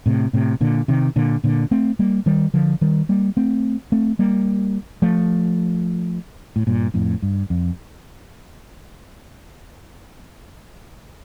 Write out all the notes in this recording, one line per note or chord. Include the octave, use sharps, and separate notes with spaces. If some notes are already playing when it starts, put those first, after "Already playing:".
A2 C3
A2 C3
A#2 D3
C3 D#3
A#2 D3
A#2 D3
A3 C4
G3 A#3
D#3 G3
D3 F3
D#3 G3
G3 A#3
A3 C4
A3 C4
G3 A#3
F3 A3
A2
G2 A#2
F2 A2
G2
F2